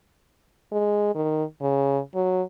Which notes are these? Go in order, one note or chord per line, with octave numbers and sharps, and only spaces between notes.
G#3
D#3
C#3
F#3